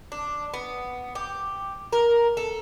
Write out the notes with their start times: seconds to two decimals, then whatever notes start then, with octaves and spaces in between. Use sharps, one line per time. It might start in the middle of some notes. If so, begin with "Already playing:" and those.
0.12 D4
0.54 B3
1.15 G4
1.93 A#4
2.37 A4